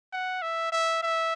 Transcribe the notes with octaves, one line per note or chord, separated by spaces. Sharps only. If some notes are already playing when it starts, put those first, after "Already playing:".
F#5
E5
E5
E5